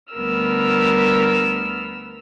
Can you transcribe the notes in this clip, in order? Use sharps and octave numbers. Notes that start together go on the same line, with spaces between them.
D2 G3 B3 A#4 E6 F6